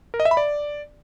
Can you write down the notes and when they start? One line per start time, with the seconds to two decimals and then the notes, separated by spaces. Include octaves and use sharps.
0.14 A#4
0.20 D#5
0.25 E5
0.31 B5
0.37 D5